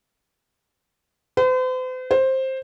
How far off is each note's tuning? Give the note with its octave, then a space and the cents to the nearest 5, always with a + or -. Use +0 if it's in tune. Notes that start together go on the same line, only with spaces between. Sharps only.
C5 -45
C5 +10